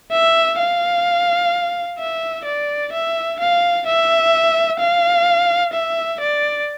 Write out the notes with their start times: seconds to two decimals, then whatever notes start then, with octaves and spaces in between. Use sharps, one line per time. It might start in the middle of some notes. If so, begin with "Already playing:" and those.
0.12 E5
0.59 F5
1.98 E5
2.45 D5
2.93 E5
3.39 F5
3.86 E5
4.79 F5
5.73 E5
6.20 D5